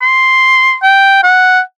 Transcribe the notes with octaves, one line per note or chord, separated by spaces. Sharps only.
C6
G5
F#5